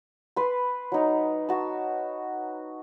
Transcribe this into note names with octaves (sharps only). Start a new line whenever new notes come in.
B4 C6
F#3 D#4
F#4 A5